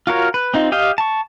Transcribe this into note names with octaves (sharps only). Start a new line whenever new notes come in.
F4 F#4 A#4 C#5
B4
C4 D#4 F4
G4 D#5 F5 G5
A5 C#6